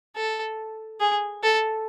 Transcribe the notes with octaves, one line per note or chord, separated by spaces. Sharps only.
A4
G#4
A4